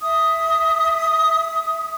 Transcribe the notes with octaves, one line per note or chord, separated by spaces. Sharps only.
E5 D#6